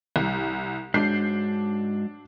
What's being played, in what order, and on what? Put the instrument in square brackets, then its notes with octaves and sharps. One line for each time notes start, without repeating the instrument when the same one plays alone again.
[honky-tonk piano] C2
[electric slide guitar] G#2 F#3 [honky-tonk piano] D4 G6 C7